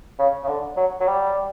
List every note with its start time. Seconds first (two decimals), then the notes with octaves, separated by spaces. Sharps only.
0.19 C#3
0.44 C#3
0.48 D3
0.77 F#3
1.00 F#3
1.07 G3